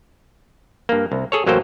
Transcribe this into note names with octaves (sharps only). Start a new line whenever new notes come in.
G2 A#3
C2
G#4 A4 C#5
A1 F#3 A#3 A4 C5 G5